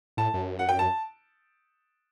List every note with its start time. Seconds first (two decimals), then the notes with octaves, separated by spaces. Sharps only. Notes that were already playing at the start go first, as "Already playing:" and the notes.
0.17 A2 A5
0.34 F#2
0.59 F#5
0.69 G5
0.79 A5